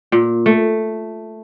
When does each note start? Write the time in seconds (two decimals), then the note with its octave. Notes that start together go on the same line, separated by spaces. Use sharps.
0.12 A#2
0.46 A3